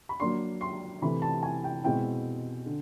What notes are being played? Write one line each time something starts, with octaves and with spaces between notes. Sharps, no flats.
B5
F#3 A#3 D4 C6
C6
C3 E3 A3 B5
A5
G#5
G5
B2 G#3 C4 E4 G5
D3